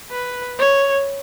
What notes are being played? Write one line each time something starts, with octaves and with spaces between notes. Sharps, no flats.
B4
C#5